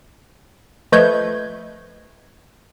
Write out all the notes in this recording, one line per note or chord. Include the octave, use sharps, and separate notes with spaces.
F3 A3 B4 D#5 G6 G#6